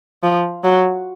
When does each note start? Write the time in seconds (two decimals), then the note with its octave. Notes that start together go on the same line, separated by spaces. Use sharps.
0.23 F3
0.64 F#3